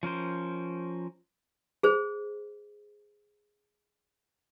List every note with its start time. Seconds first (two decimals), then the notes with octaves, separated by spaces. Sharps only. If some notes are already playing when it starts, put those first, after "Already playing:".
0.03 F3 C#4 A#4 C5
1.83 G#4 C5